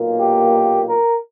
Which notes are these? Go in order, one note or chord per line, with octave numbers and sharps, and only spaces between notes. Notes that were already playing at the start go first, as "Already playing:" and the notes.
Already playing: B1 A#2 A#3
G4
A#4